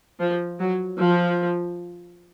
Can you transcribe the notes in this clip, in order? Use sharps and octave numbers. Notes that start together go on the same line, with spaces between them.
F3
F#3
F3